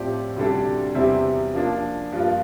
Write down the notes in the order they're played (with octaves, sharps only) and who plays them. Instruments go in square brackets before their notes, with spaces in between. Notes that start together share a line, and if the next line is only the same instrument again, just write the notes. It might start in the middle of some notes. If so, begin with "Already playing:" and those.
Already playing: [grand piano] A2 F3 C4 G4 D5
D2 C3 G3 D4 A4
E2 C3 G3 C4 E4
F3 A#3 D4
G2 F3 A#3 F4